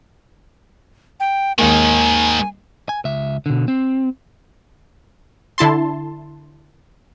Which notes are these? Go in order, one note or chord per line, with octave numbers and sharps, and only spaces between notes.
G5
D#2 G#2 D#3 G#3 A#3 G#5
G#5
C#2 E5
B2 D3
C4
D3 E4 A5 C6